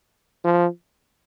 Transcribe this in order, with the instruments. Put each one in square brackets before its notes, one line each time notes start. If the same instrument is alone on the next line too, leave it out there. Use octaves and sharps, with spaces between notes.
[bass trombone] F3